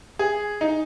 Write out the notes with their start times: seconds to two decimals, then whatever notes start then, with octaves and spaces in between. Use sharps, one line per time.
0.19 G#4
0.61 D#4